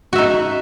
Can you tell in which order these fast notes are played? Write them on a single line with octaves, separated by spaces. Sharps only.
F#4 E5 D#4